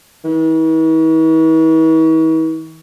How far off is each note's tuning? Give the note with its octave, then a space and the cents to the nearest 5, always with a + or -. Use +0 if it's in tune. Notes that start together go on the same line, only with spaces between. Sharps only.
E3 -45